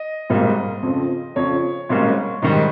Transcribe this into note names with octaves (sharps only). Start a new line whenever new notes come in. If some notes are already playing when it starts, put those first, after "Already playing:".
Already playing: D#5
G#1 G#2 G3 A#3
F2 C#3 F3 C4
F2 C#3 F3 C#5
G#1 G#2 G3 A#3 C#4
G#2 D#3 G3